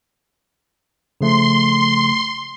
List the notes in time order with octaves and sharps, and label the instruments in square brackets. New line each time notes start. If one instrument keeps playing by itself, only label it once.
[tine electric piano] C#3 F3 A3 [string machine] C6